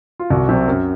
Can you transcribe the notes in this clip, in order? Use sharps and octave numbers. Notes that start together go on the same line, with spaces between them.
F4
C2 F#4
C3 F#3 C4
F#2